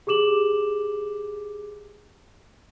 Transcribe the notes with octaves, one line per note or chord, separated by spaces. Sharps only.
G4 G#4 D6 E7 F#7